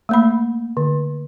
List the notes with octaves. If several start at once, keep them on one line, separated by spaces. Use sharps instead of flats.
A3 A#3 B5
D3